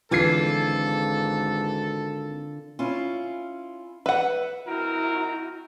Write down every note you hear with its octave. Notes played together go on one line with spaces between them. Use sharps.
G#1 D3 E3 F4 A4 G#6 C7
C#4 E4 F4
B4 E5 F#5
C4 D#4 E4 F#4 A#4